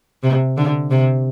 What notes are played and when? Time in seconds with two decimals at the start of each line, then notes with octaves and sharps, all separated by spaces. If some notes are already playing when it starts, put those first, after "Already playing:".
0.23 C3
0.57 D3
0.91 C3